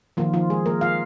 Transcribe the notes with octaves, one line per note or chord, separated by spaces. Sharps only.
D#3 F3 A#3 F4
F3 F4
G#3 G#4
A#3 A#4
F4 F5